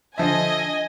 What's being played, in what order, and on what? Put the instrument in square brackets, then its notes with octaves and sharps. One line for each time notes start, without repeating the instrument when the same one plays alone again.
[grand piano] D3 F3 E5 [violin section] D#5 G#5